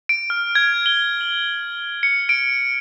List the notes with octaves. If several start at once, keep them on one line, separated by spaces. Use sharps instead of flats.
D7
F6
G#6
G7
F#7
C#7
D7